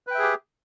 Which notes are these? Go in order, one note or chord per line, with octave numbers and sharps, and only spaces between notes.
G4 G#4 B4 E5 G5